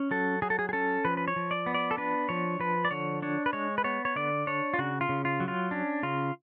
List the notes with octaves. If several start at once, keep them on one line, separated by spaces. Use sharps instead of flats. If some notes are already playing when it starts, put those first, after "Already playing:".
Already playing: C#4
F#3 A4
F#3 G#4
A4
G#4
G#4
C#4 A4
F3 B4
B4
C#5
F3
D5
B3
D5
A4
D4 B4
F3 C#5
F3 B4
D5
D3 C#5
D4 C#5
B4
G#3 C#5
B4
B3 C#5
C#5
D3 D5
D4 C#5
F4
C#3 F#4
F4
C#3
F4
F#3
F4
C#4 D4
C#3 F4